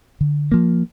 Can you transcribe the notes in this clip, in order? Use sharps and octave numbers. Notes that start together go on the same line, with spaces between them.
D3
F3 A#3